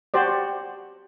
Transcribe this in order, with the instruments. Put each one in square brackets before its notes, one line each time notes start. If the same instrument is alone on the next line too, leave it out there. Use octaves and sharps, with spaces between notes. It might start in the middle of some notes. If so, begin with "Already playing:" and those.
[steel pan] F#4 G4 C5 D5